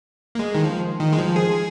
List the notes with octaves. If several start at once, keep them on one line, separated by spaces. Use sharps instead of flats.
A#3
G#3
D#3
F3
D#3
G#3
F3
G#4